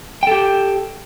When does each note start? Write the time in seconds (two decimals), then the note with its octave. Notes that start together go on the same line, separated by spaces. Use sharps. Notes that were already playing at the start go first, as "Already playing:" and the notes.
0.23 G5
0.27 A4
0.31 G4